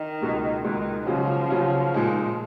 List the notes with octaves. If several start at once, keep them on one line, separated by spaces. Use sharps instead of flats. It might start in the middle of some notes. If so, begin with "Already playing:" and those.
Already playing: D#3
C#2 B2 G#3
C#2 B2 D#3 G#3
C#3 F3 F#3 C#4 F4
C#3 F#3 C#4 F4
A#2 G#3 D#4 G#4